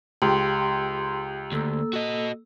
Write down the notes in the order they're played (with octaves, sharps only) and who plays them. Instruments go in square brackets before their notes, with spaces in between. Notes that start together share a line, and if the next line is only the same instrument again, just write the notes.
[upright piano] C#2 [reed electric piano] G4 [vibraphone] C6
[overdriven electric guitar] D2 [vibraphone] A#3 A4 E6
[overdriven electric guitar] F#4 D#5